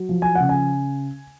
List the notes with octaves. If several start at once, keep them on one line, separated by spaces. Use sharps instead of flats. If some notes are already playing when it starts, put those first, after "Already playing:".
Already playing: F#3
F3
G#5
F#5
C#3
G#5